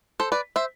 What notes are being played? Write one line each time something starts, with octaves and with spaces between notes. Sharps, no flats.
A4 C5
B4 D5
C5 E5